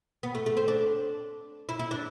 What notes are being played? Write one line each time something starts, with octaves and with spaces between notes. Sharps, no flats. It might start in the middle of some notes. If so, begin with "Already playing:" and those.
B3
A3
A3
C4
D4
E4
E4
D4